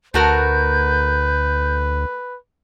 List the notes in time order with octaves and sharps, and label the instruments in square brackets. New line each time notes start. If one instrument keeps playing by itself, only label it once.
[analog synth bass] D2 [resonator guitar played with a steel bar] A3 F#4 A#4 [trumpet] B4 [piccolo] G6